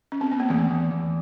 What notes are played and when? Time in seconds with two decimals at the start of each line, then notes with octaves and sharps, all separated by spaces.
0.12 C#4
0.21 C4
0.31 B3
0.40 A#3
0.50 E2 A3
0.71 E2
0.91 E2